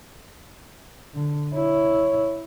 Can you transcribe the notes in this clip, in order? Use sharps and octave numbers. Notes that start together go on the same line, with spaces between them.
D3
E4 C#5